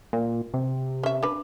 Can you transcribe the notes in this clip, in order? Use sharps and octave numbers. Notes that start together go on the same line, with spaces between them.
A#2
C3
C#4 E5
D4 B4